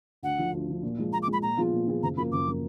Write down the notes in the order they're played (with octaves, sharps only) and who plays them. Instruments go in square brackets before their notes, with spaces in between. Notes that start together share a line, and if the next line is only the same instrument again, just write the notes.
[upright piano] D2 [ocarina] F#5
[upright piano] D3 F3
D2
D3 F3
A#2
F3 G#3
[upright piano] A#2 [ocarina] A#5
[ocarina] D6
[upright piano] F3 G#3 [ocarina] B5
[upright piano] A#2 [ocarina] A#5
[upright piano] F3 B3 F4 G#4
A#2
F3 B3 F4 G#4
[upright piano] F#1 [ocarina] A#5
[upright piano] F#2 F3 A#3 [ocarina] B5
[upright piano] F#1 [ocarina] D6
[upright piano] F3 A#3